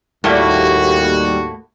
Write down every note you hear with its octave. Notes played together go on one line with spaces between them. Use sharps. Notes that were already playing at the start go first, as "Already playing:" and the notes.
D#2 A2 G3 A3 A#3 F#4